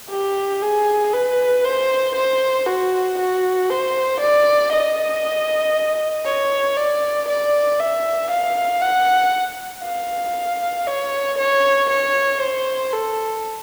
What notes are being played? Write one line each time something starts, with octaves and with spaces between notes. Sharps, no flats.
G4
G#4
B4
C5
C5
F#4
F#4
C5
D5
D#5
C#5
D5
D5
E5
F5
F#5
F5
C#5
C#5
C#5
C5
A4